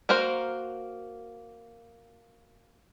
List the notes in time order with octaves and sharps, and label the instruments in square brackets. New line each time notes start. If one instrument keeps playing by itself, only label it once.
[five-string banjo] A#3 F#4 A#4 C5